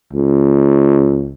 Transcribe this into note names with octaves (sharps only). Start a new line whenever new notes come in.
C#2